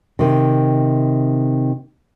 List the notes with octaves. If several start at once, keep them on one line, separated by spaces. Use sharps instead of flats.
C3 D#3